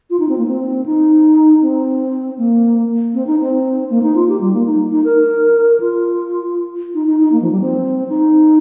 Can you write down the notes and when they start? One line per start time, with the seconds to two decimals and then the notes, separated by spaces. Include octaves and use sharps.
0.10 F4
0.19 D#4
0.29 C4
0.38 A#3
0.48 C4
0.86 D#4
1.62 C4
2.38 A#3
3.14 C4
3.27 D#4
3.39 C4
3.90 A#3
4.03 D#4
4.15 F4
4.28 G4
4.41 G3
4.53 A#3
4.66 D#4
4.91 D#4
5.04 A#4
5.80 F4
6.94 D#4
7.07 D#4
7.20 D#4
7.32 A#3
7.42 F3
7.51 G3
7.61 C4
8.09 D#4